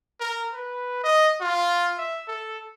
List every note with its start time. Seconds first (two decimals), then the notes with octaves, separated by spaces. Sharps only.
0.20 A#4
0.53 B4
1.04 D#5
1.41 F4
1.98 E5
2.28 A4